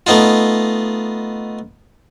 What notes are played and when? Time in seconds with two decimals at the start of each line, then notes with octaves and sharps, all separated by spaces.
0.07 A3 B3 D#4 F4